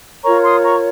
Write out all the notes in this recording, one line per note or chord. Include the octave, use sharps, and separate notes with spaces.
F4 A#4 C#5 A#5 C#6
C6 D#6
A#5 C#6